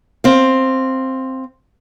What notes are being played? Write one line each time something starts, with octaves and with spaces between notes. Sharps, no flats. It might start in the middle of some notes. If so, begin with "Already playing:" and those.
C4 F5